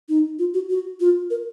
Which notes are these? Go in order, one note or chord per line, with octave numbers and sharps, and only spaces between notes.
D#4
F4
F#4
F#4
F4
A#4